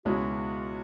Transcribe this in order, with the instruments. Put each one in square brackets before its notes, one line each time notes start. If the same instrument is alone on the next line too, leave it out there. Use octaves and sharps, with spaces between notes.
[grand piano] C#2 B2 G#3 C#4 E4 [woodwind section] F#4